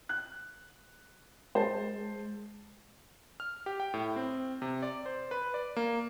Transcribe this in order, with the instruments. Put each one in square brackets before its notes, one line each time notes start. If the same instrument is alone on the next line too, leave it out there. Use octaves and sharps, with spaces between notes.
[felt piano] F#6
[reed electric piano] G#3 [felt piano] C5 A5
[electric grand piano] F6
G4
G5
A2
C4
C3
D5
C5
B4
D5
A#3